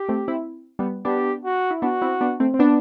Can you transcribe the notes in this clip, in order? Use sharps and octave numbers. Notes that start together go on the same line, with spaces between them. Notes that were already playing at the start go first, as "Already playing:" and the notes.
Already playing: G4
A3 C4
C4 E4
G3 B3
B3 D4 G4
F#4
E4
B3 D4 F#4
C4 E4
B3 D4
A3 C4
C4
B3 D4